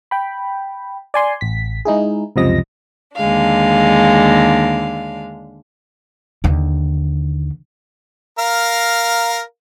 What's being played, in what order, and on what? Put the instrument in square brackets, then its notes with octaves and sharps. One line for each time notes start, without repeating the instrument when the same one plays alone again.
[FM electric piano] G5 B5
D5 G#5 C6
A1 B6
G#3 D#4 E4 G#4
C#2 F#2 C3 F3 D#5 A#6
[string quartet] D#2 D3 G#3 D4 F5
[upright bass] D#2 D3
[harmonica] A#4 F5